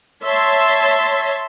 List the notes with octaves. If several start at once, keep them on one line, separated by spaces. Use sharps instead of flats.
C#5 E5 A5 C6